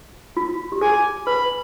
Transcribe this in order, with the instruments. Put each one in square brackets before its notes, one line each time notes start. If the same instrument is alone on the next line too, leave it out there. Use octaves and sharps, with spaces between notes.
[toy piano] F4
G4
[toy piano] G#4 [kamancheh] G#5
[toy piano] B4 [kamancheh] B5